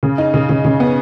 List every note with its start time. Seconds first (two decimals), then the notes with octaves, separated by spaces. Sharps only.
0.03 C#3
0.18 D#4
0.34 C#3
0.49 C#3
0.65 C#3
0.80 B3